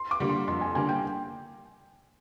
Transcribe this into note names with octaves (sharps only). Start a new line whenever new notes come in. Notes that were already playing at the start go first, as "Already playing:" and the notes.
Already playing: C6
D6
D3 G3 A#3
C6
F2 C6
G#5
D3 G3 A#3 G#5
G5